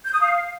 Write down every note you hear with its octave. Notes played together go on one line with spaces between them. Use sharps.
G6
D#6
F5